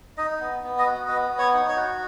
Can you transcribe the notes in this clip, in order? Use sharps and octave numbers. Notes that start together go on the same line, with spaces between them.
D#4 D#5
B3
B3
D#5
F#4
B3 D#5
B3
C#5
D#4
C#5
F#4